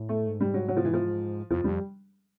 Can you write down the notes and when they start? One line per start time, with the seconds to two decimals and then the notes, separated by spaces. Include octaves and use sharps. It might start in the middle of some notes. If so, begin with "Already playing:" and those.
Already playing: A2
0.09 A3
0.27 G#2
0.41 G3
0.54 F#3
0.68 F#3
0.77 F3
0.85 E3
0.94 F3
1.51 F2 F3
1.64 F2 G3